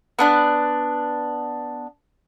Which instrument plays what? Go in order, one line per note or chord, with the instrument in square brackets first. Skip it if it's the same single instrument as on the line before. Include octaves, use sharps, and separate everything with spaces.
[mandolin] B3 D4 F#6